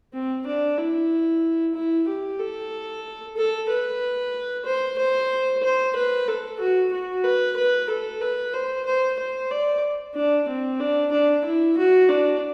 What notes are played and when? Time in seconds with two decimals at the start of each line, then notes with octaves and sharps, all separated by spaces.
0.14 C4
0.46 D4
0.77 E4
1.74 E4
2.07 G4
2.39 A4
3.36 A4
3.69 B4
4.65 C5
4.98 C5
5.63 C5
5.95 B4
6.27 A4
6.60 F#4
6.92 F#4
7.24 B4
7.56 B4
7.89 A4
8.21 B4
8.53 C5
8.86 C5
9.19 C5
9.50 D5
10.14 D4
10.48 C4
10.79 D4
11.11 D4
11.45 E4
11.77 F#4
12.08 D4